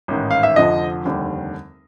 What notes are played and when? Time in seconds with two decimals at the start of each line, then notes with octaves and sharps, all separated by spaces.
0.08 A1 G#2 D#3
0.31 F5
0.43 E5
0.56 F1 F2 D3 F3 D#5
1.05 F1 D#2 D3 G3